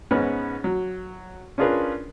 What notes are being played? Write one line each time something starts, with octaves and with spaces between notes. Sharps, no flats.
G#2 B3 C#4 F6 F#6
F#3
C#4 D4 F4 G#4 A#4 B4